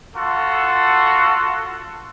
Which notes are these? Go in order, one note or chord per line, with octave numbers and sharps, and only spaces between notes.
F4 F#4 A4